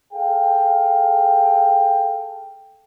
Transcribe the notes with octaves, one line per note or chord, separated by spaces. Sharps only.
G#4 A4 F5 G5